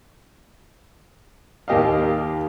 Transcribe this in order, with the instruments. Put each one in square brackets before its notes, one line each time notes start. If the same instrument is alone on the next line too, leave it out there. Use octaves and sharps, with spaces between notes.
[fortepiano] D#2 A#3 G4 D#5 F5